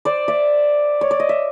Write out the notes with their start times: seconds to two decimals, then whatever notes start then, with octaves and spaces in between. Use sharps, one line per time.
0.05 C5 D5
0.28 D5 E5
1.01 C#5
1.11 D5
1.20 D#5
1.29 E5